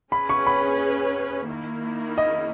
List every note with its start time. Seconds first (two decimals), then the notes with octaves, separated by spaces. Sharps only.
0.12 C#4 G#4 B4 B5
0.29 C#6
0.47 B5
1.49 D#3 A#3 E4
2.18 D#5